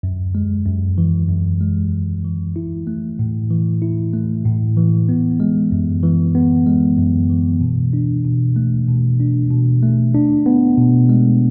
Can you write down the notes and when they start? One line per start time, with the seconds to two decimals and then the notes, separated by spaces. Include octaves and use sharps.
0.03 F#2
0.35 G#3
0.66 F#2
0.98 E3
1.29 F#2
1.61 G#3
1.92 F#2
2.25 E3
2.56 E4
2.87 A3
3.19 A2
3.50 E3
3.82 E4
4.14 A3
4.45 A2
4.77 E3
5.09 B3
5.40 G#3
5.72 F#2
6.03 E3
6.35 B3
6.67 G#3
6.98 F#2
7.30 E3
7.61 B2
7.93 D4
8.25 B2
8.56 A3
8.88 B2
9.20 D4
9.51 B2
9.83 A3
10.14 D4
10.46 B3
10.78 B2
11.09 G#3